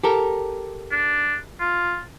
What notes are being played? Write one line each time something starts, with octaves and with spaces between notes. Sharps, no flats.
G4 A4 A#4
D4
F4